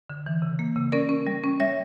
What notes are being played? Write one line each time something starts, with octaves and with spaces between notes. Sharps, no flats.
D3
E3
C#3
A#3
C#3
C#4 A#4 D5
C#4
G3
C#4
G3 C#5 E5